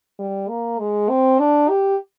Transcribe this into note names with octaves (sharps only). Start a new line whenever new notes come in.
G3
A#3
G#3
C4
D4
G4